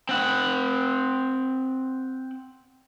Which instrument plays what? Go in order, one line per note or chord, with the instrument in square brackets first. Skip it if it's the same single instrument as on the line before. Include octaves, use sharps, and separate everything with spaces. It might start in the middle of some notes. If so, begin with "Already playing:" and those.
[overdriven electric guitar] C4 F#5